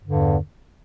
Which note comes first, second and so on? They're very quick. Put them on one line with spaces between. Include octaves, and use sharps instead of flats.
G2 D3 E2